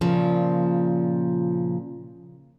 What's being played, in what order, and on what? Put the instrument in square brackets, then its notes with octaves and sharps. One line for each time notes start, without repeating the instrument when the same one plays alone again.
[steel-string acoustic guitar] A#2 C#3 F3